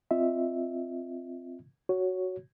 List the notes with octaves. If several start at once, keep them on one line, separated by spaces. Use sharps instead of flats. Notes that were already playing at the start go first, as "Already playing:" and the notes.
C4 F4 D#5 E5
F#4 C#5